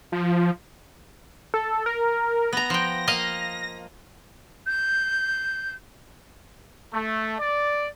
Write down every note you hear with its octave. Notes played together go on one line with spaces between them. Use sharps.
F3
A4
A#4
B3 A#5 A#6
F3 G5
A#3 D#5 F5
G6
A3
D5